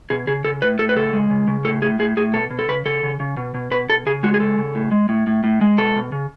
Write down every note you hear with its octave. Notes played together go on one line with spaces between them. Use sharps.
B2 G#4
C#3 G#4
C#3 A4
A2 B4
A2 A4
B4
C#3 A4
G#3
C#3
C#3
A2 A4
A2 G#4
A2 G#4
A2 G#4
B2 A4
B2
A4
C#3 B4
C#3 A4
C#3
C#3
B2
B2
B2 B4
B2 A4
C#3 G#4
G#3 F#4
G#4
C#3 A4
C#3
A2
G#3
A2
A2
A2
G#3
B2 A4
B2
C#3